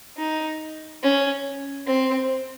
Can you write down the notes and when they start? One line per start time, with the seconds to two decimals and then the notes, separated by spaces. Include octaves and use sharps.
0.17 D#4
1.03 C#4
1.87 C4